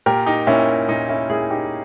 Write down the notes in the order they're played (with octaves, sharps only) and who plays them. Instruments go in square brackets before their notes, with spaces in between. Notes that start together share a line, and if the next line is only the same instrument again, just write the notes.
[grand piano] A#2 G4 A#4
D#4 G4
A#2 C#4 E4
A#2 D#4
C#4 E4
A#2 E4 G#4
D#4 G4